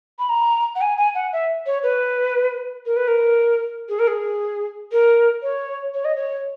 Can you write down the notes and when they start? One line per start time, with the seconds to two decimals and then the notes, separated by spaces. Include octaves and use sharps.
0.19 B5
0.29 A#5
0.75 F#5
0.81 G#5
0.98 G#5
1.15 F#5
1.33 E5
1.66 C#5
1.83 B4
2.86 A#4
2.96 B4
3.08 A#4
3.89 G#4
3.99 A#4
4.07 G#4
4.92 A#4
5.42 C#5
5.94 C#5
6.05 D#5
6.16 C#5